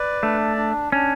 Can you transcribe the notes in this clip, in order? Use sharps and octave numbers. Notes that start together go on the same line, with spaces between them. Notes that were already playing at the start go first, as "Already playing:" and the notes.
Already playing: B4 D5
A3 D4
D4
C#4 D4